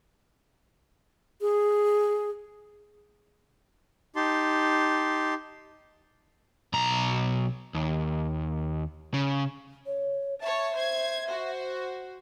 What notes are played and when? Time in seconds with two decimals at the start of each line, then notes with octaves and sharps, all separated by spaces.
1.41 G#4
4.16 D#4 G4 A5 C6
6.73 B1 A#5
7.74 D#2
9.14 C#3
9.86 C#5
10.41 C#5 E5 A5
10.74 C5 G#6
11.25 F#4 C5